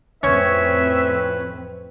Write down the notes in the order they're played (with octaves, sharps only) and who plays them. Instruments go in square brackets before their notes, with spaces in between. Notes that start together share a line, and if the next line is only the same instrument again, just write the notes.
[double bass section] F2 A2 C4 [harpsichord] C#4 [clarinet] B4 [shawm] E5